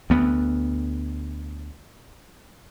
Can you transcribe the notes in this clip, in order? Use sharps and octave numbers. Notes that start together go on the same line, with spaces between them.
D2 B3